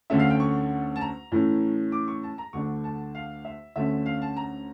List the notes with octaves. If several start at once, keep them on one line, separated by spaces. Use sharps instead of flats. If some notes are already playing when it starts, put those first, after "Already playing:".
D2 D3 A3 C#4 E5
F5
G5
C#6
A5
A#5
A2 E3 A3 C#4
D6
C#6
A5
A#5
D2 D3 A3 D4 C#6
A5
F5
E5
D2 D3 A3 C#4 E5
F5
A5
A#5